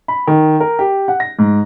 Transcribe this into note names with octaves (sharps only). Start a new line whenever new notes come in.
B5
D#3
A#4
G4
F#5
A#6
G#2